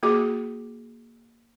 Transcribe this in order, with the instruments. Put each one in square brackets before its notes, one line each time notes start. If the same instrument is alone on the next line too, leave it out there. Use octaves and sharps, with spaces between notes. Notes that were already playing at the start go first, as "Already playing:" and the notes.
[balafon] A#3 F#4 G#4 D6